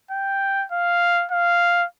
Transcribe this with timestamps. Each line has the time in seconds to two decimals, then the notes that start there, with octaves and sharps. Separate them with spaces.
0.11 G5
0.72 F5
1.31 F5